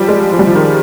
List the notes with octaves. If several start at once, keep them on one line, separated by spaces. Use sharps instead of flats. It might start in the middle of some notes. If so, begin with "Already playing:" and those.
Already playing: F3 G3
G#3
F3
G3
F3
D#3